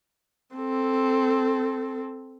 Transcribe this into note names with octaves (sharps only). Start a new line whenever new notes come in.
C4 A4